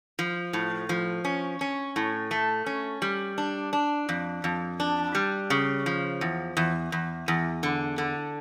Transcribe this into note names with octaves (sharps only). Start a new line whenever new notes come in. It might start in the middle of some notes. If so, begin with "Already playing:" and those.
F3
A2
F3
C#4
C#4
A2
A3
C#4
G3
D4
D4
F2
F2
D4
G3
C#3
F3
E2
E2
E2
E2
D3
D3